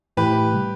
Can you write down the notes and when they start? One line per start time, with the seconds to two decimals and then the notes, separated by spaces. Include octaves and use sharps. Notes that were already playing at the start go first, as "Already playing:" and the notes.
0.17 A2 E3 A3 E4 G4 B4
0.53 C3 G3